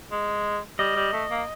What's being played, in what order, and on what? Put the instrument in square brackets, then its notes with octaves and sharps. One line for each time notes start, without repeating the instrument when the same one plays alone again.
[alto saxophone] G#3
[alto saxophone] G3 [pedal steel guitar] D#5
[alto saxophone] G3
A3
A#3